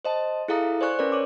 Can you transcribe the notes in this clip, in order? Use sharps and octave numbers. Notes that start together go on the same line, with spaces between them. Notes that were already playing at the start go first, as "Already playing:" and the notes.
C5 D#5 A5
E4 G#4 A4 F5 A#5 D#6
C5 D5 G#5 C#6 F#6
C#4 A#4 B4 D5
C#5 D6